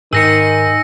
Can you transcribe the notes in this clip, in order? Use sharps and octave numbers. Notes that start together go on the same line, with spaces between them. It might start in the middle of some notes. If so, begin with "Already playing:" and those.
G#2 D#3 D#4 G#4 E6 A#6 C#7